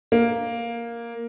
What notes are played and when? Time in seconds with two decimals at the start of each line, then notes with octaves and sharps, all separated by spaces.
0.12 A#3